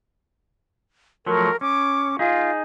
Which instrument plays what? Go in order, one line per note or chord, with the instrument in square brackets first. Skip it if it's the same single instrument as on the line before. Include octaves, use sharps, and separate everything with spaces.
[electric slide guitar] F3 F#3 A3 [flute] A#4
[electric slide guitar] C#4 [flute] D6
[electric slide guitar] D#4 G#4 [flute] F4